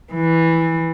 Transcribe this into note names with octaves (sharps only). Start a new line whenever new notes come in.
E3